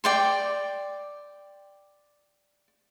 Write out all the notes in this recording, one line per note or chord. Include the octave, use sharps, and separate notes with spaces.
D5 G5 C6